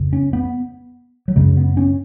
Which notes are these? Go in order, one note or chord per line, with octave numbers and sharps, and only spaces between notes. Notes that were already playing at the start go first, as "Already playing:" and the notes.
Already playing: F2 C#3
C#4
B3
F#3
F#2 C#3 G#3
B3
C#4